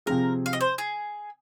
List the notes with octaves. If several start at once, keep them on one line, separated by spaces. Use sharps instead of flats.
C3 F3 C4 G#4 A#4
F5
D#5
C5
G#4